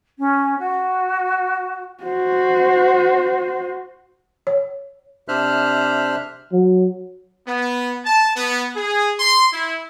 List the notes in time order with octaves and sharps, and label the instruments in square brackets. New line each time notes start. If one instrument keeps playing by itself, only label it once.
[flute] C#4
F#4
[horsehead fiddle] F#4 C5
[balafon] C#5
[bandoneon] C3 D4 C5 E5 F6 F#6
[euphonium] F#3
[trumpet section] B3
A5
B3
G#4
C6
E4